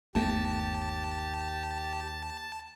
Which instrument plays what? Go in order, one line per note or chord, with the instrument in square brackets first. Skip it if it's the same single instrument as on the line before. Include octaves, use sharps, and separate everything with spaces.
[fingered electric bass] G1 A3 B3 [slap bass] D#2 [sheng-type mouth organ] G4 [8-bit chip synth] A5